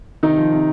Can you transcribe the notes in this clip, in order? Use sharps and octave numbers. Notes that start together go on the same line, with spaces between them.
C3 D#3 D#4
F3
C3